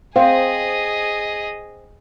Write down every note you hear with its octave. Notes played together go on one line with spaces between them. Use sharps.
C4 G#4 C5 D#5 F5